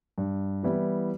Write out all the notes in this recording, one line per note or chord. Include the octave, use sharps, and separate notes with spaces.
G2
E3 G3 B3 E4